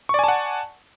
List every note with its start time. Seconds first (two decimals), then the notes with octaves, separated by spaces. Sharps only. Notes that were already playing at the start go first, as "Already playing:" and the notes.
0.09 C#6
0.14 D5
0.19 G#5
0.24 A5
0.28 F#5